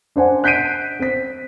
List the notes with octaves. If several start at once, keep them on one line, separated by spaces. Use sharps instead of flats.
D4 C5 F#5 G#5
F#6 G6 B6 C7 D7 D#7
C4 B6